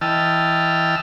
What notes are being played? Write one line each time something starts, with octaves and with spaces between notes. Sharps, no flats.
E3 D#5 G5 A5 E6 F6